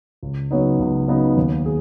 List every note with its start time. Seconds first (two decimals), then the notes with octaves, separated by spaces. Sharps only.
0.23 C#2
0.51 C#3 F#3 B3 D#4
0.79 C#2
1.08 C#3 F#3 B3 D#4
1.37 D#2
1.66 G#4